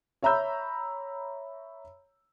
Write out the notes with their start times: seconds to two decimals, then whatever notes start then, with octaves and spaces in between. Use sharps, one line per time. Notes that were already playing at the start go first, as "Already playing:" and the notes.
0.23 C#5 E5 A#5 B5 E6 G6